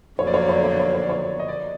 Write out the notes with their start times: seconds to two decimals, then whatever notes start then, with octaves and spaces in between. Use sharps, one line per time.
0.19 F2 D3 F#3 A#3 C#5
0.27 D5
0.34 C#5
0.42 D5
0.49 C#5
0.57 D5
0.64 C#5
0.72 D5
0.80 C#5
0.87 D5
0.94 C#5
1.02 D5
1.09 C#5
1.39 D#5
1.48 D5